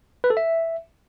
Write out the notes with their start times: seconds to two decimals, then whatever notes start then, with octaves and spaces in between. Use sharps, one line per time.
0.24 B4
0.30 A4
0.37 E5